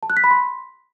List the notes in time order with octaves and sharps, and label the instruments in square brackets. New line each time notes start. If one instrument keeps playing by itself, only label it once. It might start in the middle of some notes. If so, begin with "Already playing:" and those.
[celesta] A5
F#6
B6
B5
C6